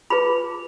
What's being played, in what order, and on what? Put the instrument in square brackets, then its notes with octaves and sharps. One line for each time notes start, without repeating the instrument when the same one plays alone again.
[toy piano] F4 G#4 B4 B5